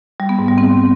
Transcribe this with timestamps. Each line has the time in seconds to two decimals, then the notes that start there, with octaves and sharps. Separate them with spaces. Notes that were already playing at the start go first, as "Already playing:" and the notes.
0.20 G3
0.29 B3
0.39 G#2
0.48 G3
0.58 C4